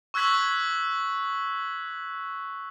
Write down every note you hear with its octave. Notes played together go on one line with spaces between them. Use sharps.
C#6 E6 F#6 G#6 B6 F#7